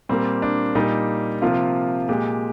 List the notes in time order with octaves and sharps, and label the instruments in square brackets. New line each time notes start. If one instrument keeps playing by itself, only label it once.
[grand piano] A#2 G3 A#3 C4
D4
A#2 G3 A#3 D#4
C3 F3 A#3 F4
A#2 G#3 G4